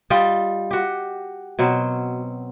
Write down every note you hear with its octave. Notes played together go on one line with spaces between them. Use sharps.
G3 F4 D#5 G5
F#4 G4
B2 F#3 C4